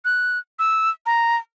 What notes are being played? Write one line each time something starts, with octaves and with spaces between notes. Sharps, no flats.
F#6
E6
A#5